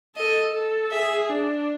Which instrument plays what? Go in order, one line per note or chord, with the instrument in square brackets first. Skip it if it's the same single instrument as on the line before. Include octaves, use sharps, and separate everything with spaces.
[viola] A4 [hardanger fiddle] D#5
[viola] A4
[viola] G#4 [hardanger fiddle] E5
[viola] D4